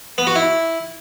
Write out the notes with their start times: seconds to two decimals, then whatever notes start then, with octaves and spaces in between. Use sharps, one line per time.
0.18 B3
0.27 F#4
0.36 E4